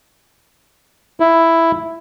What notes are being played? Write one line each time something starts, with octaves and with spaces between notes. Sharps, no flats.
E4